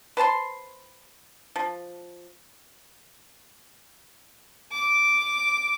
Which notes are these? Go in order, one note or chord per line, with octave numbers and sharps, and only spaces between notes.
B4 C5 A5 C6
F3
D6